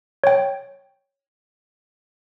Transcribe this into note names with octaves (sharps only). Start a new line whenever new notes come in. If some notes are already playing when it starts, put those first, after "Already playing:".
C#5 G5